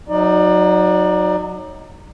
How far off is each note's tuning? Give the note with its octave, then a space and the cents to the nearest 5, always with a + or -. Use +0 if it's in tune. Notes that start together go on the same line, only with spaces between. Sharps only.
F#3 -10 D#4 +5 D5 +25